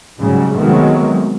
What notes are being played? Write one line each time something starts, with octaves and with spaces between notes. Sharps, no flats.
G#2 C#3 F#3 G3
C3 D#3 F#3 G#3 A3 B3